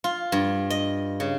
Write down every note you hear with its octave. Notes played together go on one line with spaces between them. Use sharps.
F4
G2
D#5
C#3